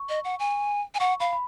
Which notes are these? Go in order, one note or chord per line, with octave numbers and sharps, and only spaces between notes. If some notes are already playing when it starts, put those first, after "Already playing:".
Already playing: C#6
D#5
F#5
G#5
G#5
F#5 C#6
F5 B5
B5